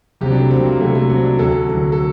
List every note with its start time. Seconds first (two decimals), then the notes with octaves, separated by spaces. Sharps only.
0.21 C2 C3 F#3 G4
0.32 D4
0.41 A3
0.51 C2 C3 F#3 C4
0.66 A#3
0.80 C2 C3 F#3 A3
0.95 A3
1.10 C2 C3 F#3
1.24 D4
1.39 D2 D3 F#3 A4
1.68 D2 D3 F#3
1.92 A4